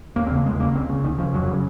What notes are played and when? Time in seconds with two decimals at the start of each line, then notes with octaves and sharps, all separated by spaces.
0.16 D#2 A#3
0.27 C4
0.31 C#3 A#3
0.45 D#2 G#3
0.60 C#3 A#3
0.75 C#2 C4
0.89 C#3
1.04 C#2 D#3
1.18 C#3 F3
1.33 F2 F#3
1.48 C#3